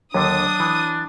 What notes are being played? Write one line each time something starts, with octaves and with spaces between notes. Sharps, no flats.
D#2 D3 F#3 D4 D#6
E3